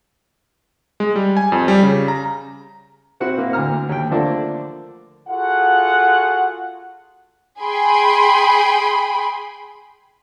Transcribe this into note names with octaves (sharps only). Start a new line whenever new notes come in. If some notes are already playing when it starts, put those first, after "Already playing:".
G#3
G3
G#5
F2
G3
C#3
A#5
C4 E4 F#4 F#5
A#3 C4 E4
D2 D3 A#5 F6
D#2 G5
D3 F3 A3 A#3 D4 A4
F4 F#4 G#4 A4 F#5
G#4 G5 G#5 B5 C6